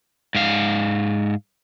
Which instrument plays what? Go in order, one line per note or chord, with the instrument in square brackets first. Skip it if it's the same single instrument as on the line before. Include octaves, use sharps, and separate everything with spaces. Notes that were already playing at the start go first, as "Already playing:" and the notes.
[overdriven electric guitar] G#2 F5